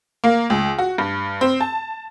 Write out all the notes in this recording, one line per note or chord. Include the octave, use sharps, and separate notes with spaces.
A#3
C#2
F#4
G2
C4
A5